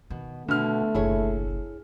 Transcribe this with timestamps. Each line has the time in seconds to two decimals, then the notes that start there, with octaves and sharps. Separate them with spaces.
0.10 B2 D#3
0.48 B2 D3 A3 F6
0.95 F#1 B1 E4 G#4 C#5